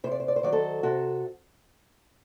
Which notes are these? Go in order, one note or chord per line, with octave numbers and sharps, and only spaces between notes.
C3 C5
D5
C5
D5
C5
D#3 F#3 D5
A4 C5
C3 F#4 A4